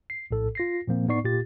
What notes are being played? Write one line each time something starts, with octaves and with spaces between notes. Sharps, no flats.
C7
A#1 A2 A4
F4 A#6 C7
A#2 F3 A#3 C4
A2 B3 D#4 D5 C#6 C7
A#2 F4 G4 A6